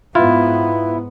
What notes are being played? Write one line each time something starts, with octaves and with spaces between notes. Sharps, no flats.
G#2 B3 E4 F4